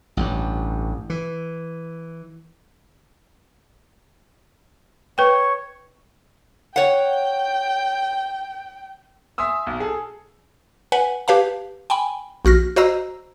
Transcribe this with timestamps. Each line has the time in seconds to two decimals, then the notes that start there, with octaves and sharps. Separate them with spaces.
0.17 A1 G2
1.10 E3
5.18 B4 C#5 G5
6.76 C#5 F#5 G5
9.38 E5 G#5 C6 D#6 E6
9.67 B1
9.80 G#4 A4
10.92 B4 F#5 G#5
11.28 G4 B4 F5 A5
11.90 G5 G#5 B5
12.45 A#1 F#4 F6 A#6
12.76 F#4 C5 D#5 A#5 E6